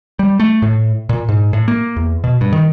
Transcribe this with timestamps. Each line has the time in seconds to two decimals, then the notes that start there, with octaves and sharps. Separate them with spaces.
0.19 G3
0.40 A3
0.62 A2
1.09 A#2
1.29 G#2
1.53 A2
1.68 A#3
1.96 E2
2.24 B2
2.41 G2
2.53 D#3